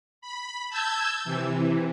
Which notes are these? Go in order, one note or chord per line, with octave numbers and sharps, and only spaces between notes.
B5
A5 E6 G6 G#6
C3 E3